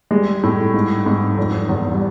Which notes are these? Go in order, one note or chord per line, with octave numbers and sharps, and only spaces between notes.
G3 G#3
A2
G#2
G#2
F1 F3
E2
G3